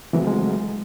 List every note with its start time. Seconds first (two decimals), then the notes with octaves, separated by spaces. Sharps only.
0.13 C#3 E3 F#3 A3 C4
0.27 G#3